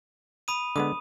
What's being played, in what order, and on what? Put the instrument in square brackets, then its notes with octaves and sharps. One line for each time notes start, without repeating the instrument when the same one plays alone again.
[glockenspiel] B5 D#6 D#7
[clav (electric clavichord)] D3 G#3 B3 [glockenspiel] D#6